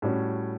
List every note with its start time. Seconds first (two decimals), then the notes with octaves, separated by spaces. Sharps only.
0.02 A2 G3 C#4 F#4